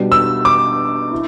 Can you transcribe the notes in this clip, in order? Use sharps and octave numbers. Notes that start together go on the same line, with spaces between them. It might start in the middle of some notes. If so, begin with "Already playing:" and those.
Already playing: B2 G3 D4
E6
D6
E4